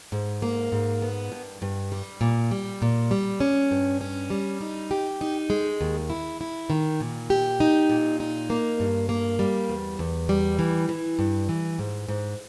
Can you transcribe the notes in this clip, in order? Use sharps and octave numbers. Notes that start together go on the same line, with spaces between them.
G#2
A#3
G#2
B3
G2
G2
G3
A#2
G3
A#2
G3
C#4
G2
C#4
G3
D#4
G4
D#4
G#3
D#2
E4
E4
D#3
A#2
G4
D#4
A#2
D#4
A#3
G2
A#3
G3
E2
E2
G3
E3
E3
G2
E3
G#2
G#2